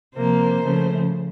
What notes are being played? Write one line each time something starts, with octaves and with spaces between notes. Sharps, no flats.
C3 F3 A#3 C5
C#3 F3 A3